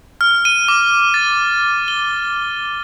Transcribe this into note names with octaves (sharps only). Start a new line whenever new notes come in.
F6
D#7
D6
A6
G7